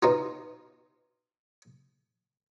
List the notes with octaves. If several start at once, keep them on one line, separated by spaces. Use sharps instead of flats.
B2 D#4 F4